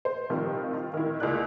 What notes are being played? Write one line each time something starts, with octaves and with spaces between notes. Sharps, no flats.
C5
C3 D#3 F3 G3
F4
D#3 E4
C#2 G#3 A#3 D5 F#6